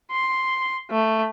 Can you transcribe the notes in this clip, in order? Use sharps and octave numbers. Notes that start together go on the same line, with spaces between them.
C6
A3